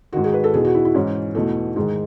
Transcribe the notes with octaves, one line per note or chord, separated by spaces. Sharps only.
G#2 D#3 F#4
G#4
B4
A4
E2 B2 G#4
F#4
E4
E4
G#2 E3 C#4
E2 B2 A3
G#2 D#3 G#3